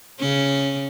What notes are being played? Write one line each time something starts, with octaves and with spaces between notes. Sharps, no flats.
C#3 C#4